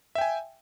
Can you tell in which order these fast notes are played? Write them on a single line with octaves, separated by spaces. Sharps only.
E5 G5 G#5